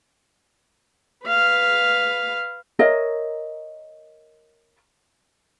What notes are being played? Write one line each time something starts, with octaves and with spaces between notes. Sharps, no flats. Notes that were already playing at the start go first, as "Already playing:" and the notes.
B4 F5
A#4 C#5 D#5 E5